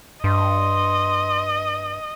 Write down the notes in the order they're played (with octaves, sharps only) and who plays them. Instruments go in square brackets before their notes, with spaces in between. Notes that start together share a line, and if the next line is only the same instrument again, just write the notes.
[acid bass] G2 [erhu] D#5 [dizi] C6